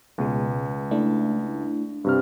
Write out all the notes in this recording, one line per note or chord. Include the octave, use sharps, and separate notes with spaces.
C#2 B2 G#3
A3 D4 E4
G2 C3 F6